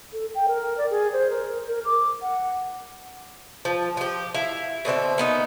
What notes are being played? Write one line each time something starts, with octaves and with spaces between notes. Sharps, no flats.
A4
G5
A#4
D5
G#4
C5
A#4
A#4
D6
F#5
F3
F3 G4
E4 E5 F5
B2 D3 C4 E5
A#3 B3 D#4